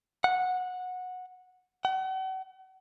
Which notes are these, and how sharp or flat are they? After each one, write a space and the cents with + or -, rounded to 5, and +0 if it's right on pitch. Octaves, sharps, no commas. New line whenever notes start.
F#5 -15
F#5 +40